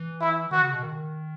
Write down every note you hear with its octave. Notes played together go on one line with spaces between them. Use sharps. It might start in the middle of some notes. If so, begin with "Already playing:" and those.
Already playing: E3
E4
D#3 F#4
C#3
B2
D#3